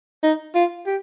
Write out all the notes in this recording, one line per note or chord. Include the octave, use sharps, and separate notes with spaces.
D#4
F4
G4